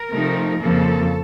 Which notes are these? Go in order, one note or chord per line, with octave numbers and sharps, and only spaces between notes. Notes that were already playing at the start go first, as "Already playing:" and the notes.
Already playing: A#4
C3 F3 A3 D#4
F2 C#3 F3 A#3 A4